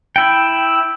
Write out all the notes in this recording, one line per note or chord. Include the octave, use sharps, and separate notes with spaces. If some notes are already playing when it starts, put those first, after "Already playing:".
E4 G5